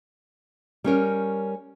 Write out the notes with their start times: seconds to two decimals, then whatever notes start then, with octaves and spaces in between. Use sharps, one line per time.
0.84 G3 C#4 A#4 C#5